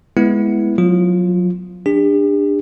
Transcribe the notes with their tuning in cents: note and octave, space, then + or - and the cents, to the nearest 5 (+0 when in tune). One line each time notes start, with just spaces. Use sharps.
G#3 +15 B3 +0 E4 +0
F#3 -35 F4 +0
D4 +10 G4 +45